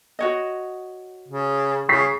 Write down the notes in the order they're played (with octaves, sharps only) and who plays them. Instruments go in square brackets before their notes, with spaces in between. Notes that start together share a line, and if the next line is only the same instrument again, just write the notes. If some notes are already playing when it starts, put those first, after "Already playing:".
[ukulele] F#4 C#5 D#5
[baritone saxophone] C#3
[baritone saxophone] C#3 [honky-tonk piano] C#6 B6 C7